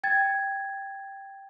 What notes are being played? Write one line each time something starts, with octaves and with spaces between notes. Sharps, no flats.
G5 G#6 A6